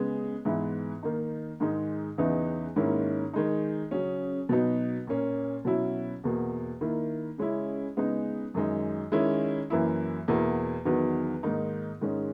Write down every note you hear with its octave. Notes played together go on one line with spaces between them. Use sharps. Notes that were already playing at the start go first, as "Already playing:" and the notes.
Already playing: C#3 G#3 B3
G#2 E3 B3 E4
D#3 A#3 D#4
G#2 D#3 G#3 D#4
E2 C#3 E3 B3 D#4
G#2 D#3 A#3 C#4 E4
D#3 G#3 D#4
C#3 F#3 C#4
B2 F#3 B3 D#4
A#2 A#3 C#4
B2 F#3 C#4 E4
E2 B2 A#3
D#3 A#3 E4
C#3 G#3 C#4 E4
C#3 G#3 B3 D#4
F#2 D#3 G#3 D#4
D#3 G#3 C#4 E4
F#2 E3 A#3 E4
E2 B2 A#3 E4
E2 D#3 F#3 B3
G#2 D#3 A#3 D#4
G#2 D#3 G#3 C#4